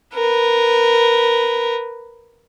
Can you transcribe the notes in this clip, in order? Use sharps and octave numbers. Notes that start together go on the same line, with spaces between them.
A#4 B4